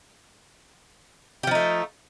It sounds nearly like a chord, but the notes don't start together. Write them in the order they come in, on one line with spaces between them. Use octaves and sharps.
G4 F3 D#4 A3